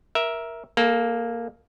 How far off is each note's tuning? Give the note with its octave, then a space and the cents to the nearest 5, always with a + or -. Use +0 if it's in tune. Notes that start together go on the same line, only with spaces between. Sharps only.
A#4 +15 E5 +0
A#3 +0 A4 -25